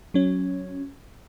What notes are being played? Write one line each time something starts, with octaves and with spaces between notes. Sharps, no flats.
F#3 C#4